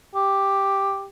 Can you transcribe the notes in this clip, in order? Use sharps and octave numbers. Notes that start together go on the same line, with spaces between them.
G4